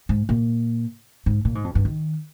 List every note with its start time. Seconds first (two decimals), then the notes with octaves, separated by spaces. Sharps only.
0.09 G#2
0.29 A#2
1.26 G#2
1.45 A#2
1.55 G#2
1.64 F2
1.75 G2
1.85 D#3